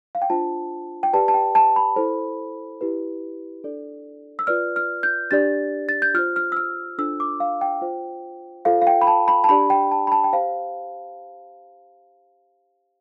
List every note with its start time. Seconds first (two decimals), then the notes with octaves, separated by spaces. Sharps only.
0.15 F5
0.22 G5
0.30 D4 F4 C5 A5
1.03 G5
1.13 G4 B4 D5 A5
1.28 A5
1.34 G5
1.55 A5
1.76 B5
1.96 E4 A4 C5
2.81 E4 G4 B4
3.64 D4 A4 D5
4.39 E6
4.47 F4 B4 D5 F6
4.76 F6
5.03 G6
5.31 D4 G4 D5 A6
5.89 A6
6.02 G6
6.14 F4 C5 F6
6.36 F6
6.52 E6
6.57 F6
6.98 D4 F4 A4 C5 E6
7.20 D6
7.40 F5
7.61 G5
7.81 F4 C5
8.65 F4 A4 C5 F5
8.82 F5
8.87 G5
9.01 B5
9.07 A5
9.28 B5
9.44 A5
9.49 D4 G4 D5 B5
9.70 G5
9.92 A5
10.07 B5
10.12 A5
10.24 G5
10.33 G4 C5 F5